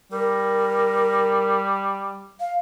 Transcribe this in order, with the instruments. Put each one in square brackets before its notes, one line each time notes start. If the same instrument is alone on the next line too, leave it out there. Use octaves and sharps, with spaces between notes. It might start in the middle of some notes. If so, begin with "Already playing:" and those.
[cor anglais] G3 [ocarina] A#4
[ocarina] F5